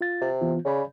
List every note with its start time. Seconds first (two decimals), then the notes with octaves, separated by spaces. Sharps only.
0.01 F4 F5 A6
0.21 C3
0.41 E3 B3 F4
0.65 C#3 C#5 D5 B5